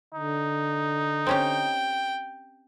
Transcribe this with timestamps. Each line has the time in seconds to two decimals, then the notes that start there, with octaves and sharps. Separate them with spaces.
0.14 D3 D#4
1.27 C4 C#4 G4 G5